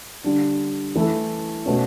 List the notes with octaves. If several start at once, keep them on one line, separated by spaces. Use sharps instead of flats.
D3 G3 D4
E3 A3 E4 A4
B2 A3 C#4